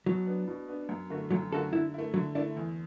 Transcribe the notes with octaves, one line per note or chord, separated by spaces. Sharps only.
B2 F#3
B3 D4
B2
B3 D4
F#2
D3 A3 F#4
F#2 F#3
D3 A3 F#4 A4
D3 E4
A3 E4
D3 F#3
A3 D4 E4
E2